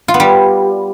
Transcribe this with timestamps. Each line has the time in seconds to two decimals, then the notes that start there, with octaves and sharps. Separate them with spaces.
0.08 F4
0.14 B3
0.20 G3